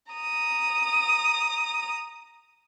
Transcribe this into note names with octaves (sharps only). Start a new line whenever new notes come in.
A#5 D#6